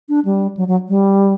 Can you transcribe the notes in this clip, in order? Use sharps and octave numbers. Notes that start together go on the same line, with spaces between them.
D4
G3
F#3
F#3
G3